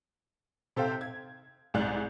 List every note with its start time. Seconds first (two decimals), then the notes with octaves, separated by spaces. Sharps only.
0.76 C3 A4 C5 F5 G5
1.01 G#6
1.74 C2 G#2 G#4 D5 F#6 G6